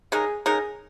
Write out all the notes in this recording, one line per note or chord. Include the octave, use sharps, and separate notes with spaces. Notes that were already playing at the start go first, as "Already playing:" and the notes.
C#3 G#3 D#4 G#4 A#4
C#3 G#3 D#4 G#4 A#4